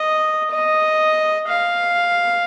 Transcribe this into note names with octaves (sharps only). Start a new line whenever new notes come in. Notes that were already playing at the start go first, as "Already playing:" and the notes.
Already playing: D#5
D#5
F5